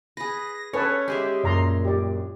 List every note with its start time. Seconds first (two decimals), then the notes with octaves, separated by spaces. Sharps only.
0.17 G#4 B4 A#6
0.73 C#4 A4 B4 C#5 A5
1.08 G#3 G4 G#4 E5
1.44 F#2 A#2 D5 A#5 C6
1.85 G4 D5